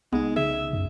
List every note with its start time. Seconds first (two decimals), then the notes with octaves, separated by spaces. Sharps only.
0.13 C2 G#3 B3 D#4
0.36 C#3 G#4 E5
0.73 F#2